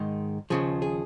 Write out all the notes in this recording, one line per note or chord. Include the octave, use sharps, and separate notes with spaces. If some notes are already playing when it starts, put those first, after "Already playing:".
Already playing: G#2 D#3 G#3
D#2 C#3 F3 G#4
G#4